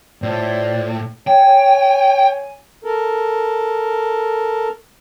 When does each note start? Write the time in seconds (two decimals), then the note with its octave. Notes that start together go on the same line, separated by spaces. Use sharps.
0.22 A2 F4 C5 D5
1.27 C#5 G5 G#5
2.84 A4 A#4